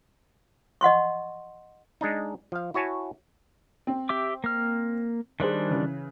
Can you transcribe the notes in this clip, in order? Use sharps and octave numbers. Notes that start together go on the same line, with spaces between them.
D#5 F#5 C6 C#6
G#3 D4 D#4
F3 F5
E4 F#4 C#5 G#5 A5
C4
G4 E5 D6
A#3 F6
D#3 G3 D4 G#4 C5 F#6
C#3 E3